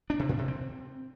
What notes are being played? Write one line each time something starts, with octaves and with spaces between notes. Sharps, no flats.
D4
C3
A2
C3
C4